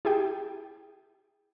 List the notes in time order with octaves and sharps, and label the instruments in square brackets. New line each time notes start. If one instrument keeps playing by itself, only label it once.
[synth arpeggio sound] E4 G4 G#4 G5